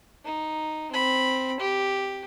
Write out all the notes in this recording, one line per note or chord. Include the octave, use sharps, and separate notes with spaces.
D#4
C4 B5
G4